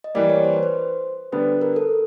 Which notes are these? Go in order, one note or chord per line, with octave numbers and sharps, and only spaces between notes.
D#5
E3 G3 A#3 D5
C#5
C5
B4
C5
D3 G3 B3 D4 B4
A#4
A4